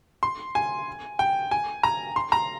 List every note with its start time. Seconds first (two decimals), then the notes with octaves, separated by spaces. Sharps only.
0.23 C6
0.55 G#5
1.19 G5
1.51 G#5
1.83 A#5
2.16 C6
2.32 A#5